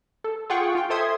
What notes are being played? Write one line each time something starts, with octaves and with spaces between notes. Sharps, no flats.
A4
F4 G#4 F#5 G5 C#6
F4 G5
A4 C5 E5 C6 D#6 G#6